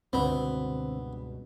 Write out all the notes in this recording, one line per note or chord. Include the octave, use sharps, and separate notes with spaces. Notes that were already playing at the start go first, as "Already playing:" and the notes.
C#2 G2 B2 D3 B3 C4